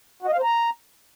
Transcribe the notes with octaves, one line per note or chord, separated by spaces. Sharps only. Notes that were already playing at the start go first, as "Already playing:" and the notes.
F#4
D#5
F5
C5
A#5